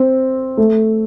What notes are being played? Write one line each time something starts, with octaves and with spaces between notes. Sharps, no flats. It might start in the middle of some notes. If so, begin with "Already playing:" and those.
Already playing: C4
A3